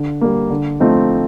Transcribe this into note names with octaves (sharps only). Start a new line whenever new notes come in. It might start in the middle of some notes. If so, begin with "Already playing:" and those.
Already playing: D3
G3 A#3
D3
F3 A3 C4 D#4